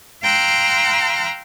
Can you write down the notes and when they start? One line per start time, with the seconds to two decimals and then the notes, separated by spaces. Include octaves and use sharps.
0.22 F5 G5 A#5 C6 E6 F#6